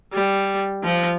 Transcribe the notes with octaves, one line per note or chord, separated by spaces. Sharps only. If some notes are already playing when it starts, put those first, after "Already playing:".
G3
F3